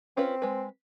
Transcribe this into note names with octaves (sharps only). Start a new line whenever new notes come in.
C4 C#4 F4 B4
G#3 B4